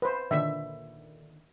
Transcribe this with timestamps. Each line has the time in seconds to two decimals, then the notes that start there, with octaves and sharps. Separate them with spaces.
0.02 B4 C5
0.31 A#2 D3 D#3 E5